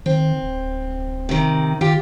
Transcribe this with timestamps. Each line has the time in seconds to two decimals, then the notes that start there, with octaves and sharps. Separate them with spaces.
0.06 D#3 C4
0.42 D1
1.29 C3 D#3
1.81 D#3 F4 G4